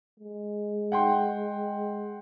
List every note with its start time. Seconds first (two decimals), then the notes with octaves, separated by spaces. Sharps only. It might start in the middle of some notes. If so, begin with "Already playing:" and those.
0.20 G#3
0.92 F#5 G5 C6